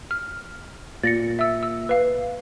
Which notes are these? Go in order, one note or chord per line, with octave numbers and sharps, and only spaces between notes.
F6
A#2 A6 A#6 C#7
E5 E6
E6
B4 F5